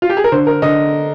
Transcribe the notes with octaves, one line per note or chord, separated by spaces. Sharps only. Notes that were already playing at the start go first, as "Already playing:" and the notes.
F4
G4
G#4
A#4
D3 C5
A#4
D3 D#5